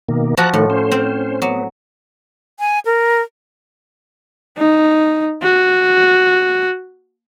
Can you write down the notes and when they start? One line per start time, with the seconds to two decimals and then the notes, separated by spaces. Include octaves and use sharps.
0.09 B2 D#3 A#3
0.37 F3 F4 F#4 A5 A#5 F#6
0.54 A2 D#3 A3
0.70 C#4 C5
0.92 C4
1.42 F#3 B3
2.60 G#5
2.85 A#4
4.57 D#4
5.43 F#4